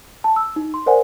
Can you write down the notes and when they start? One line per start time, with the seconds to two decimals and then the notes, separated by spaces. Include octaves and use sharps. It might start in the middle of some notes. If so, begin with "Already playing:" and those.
0.24 A5
0.36 E6
0.56 D#4
0.74 C6
0.86 A#4 C5 D5 F#5 G#5